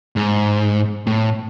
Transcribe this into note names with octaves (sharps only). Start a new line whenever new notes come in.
G#2
A2